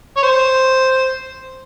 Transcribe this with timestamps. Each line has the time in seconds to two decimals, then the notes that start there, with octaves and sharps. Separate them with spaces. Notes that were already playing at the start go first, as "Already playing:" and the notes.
0.17 C#5
0.23 C5